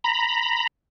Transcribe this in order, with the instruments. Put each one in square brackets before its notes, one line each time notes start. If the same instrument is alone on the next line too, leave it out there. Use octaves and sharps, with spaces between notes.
[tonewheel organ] A#5 B5